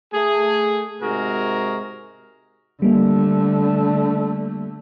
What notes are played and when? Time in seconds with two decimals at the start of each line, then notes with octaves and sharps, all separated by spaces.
0.14 A3 G#4
1.02 G#2 C3 G#3 F#4 G#4 A#4
2.82 D3 G3 A3 A#3